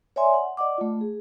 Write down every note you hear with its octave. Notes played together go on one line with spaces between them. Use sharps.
C#5 D5 E5 G#5 C6
F#5
D5 D#5 F#5 D6
A3 F4
G#4